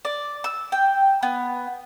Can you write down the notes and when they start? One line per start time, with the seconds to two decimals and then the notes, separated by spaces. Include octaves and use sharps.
0.05 D5
0.44 E6
0.72 G5
1.23 B3